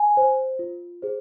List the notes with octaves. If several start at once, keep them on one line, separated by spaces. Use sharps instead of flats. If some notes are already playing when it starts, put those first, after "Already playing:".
Already playing: G#5
C5
F4
G#4 C5